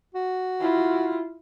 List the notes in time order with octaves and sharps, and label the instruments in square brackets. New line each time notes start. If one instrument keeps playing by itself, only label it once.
[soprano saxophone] F#4
[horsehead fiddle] E4 F4